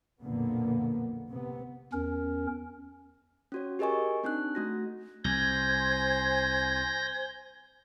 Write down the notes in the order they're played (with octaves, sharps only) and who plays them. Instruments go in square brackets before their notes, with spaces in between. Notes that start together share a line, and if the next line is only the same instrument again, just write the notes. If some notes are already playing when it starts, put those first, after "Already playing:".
[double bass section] B1 F2 A#2 D3 A#3 B3
C3 B3
[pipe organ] E2 C#4 A#4
[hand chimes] C#4 F#4 C#5
G4 G#4 A#4 D#5 G#5 C#6
C4 D4 D#4 F#6
A3 F#4 A#6
[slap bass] C2 [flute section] C5 G#5 G#6 [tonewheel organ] G6 A#6